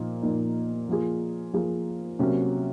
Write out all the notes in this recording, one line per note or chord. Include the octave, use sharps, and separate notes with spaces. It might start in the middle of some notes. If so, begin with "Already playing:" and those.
Already playing: A#2 F3 A#3 D#4
A#2 F3 A#3 D#4
F3 A#3 F4 G#4
F3 A#3 F4 G#4
C3 F#3 A#3 C#4 F#4